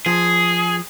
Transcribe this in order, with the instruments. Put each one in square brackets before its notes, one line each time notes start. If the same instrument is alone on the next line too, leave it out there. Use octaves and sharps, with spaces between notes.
[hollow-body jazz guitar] F3 [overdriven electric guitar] G#4